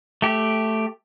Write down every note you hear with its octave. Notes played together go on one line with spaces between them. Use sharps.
A3 G4